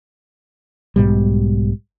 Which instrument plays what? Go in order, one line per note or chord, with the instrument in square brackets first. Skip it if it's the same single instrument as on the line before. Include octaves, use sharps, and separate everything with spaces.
[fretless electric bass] B1 G#2 B2 G3